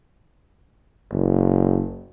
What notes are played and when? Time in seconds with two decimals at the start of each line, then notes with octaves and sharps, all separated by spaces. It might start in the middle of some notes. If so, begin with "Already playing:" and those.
1.12 F#1